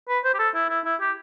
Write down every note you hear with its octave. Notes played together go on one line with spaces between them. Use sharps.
B4
C5
G4
A4
E4
E4
E4
G4